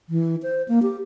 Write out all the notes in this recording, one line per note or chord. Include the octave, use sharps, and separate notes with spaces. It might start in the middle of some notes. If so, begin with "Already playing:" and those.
E3
C5
A#3
G4